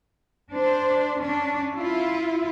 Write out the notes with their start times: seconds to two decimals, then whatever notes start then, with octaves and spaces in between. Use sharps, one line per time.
0.52 D4 C5
1.20 C#4 D4
1.74 E4 F4